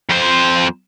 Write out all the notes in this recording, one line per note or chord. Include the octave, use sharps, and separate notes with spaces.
F2 C5